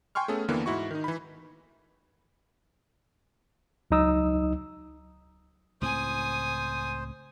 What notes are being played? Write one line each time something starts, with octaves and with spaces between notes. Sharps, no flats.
G5 G#5 C6 C#6 F6
A3 B3 C#4 G#4 A4
D#2 D3 E3 A#3 B3
G#2 E4 F#4 C#6
D#3 D#4
E3 B5
C#2 F#3 D#4 D#6 E6
C#2 A2 C4 C5 G#5 D#6